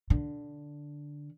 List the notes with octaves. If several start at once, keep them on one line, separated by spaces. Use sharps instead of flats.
D3